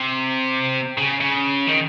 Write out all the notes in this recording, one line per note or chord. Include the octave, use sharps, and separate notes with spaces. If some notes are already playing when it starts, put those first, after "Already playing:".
Already playing: C3
C#3
C#3
D#3